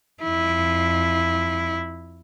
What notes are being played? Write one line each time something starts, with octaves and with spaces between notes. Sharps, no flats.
F2 E4